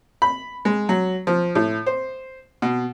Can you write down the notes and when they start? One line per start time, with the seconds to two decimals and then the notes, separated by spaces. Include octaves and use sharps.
0.22 B5
0.65 G#3
0.89 F#3
1.27 F3
1.55 A2
1.86 C5
2.62 B2